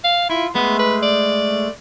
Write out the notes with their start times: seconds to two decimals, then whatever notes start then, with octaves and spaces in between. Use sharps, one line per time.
0.05 F5
0.29 E4 F4
0.55 G#3 A3 B3 G#4
0.79 B4
1.03 D5